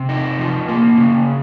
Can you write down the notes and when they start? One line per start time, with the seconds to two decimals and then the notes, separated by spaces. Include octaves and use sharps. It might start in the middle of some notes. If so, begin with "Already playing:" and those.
Already playing: C3
0.09 D#4
0.39 F3
0.68 A#3
0.98 C#3